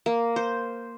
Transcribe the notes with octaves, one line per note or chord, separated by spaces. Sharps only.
A#3
C5